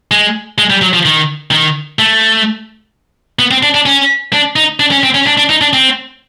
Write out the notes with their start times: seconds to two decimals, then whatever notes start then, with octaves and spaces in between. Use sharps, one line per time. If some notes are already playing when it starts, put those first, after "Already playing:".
0.11 G#3
0.58 G#3
0.70 G3
0.82 F#3
0.93 F3
1.05 D#3
1.51 D#3
1.99 A3
3.39 B3
3.51 C4
3.63 D4
3.74 D4
3.86 C#4
4.33 D4
4.56 D#4
4.80 D4
4.91 C#4
5.03 C4
5.15 C#4
5.27 D4
5.38 D4
5.50 D#4
5.61 D4
5.73 C4